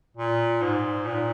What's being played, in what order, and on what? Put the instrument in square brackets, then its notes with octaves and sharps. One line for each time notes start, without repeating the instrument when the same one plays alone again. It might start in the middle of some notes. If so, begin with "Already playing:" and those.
[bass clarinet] A#2
G#2
A#2